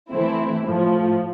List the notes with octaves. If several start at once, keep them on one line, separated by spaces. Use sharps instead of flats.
E3 A3 C4 E4
A2 F3 A3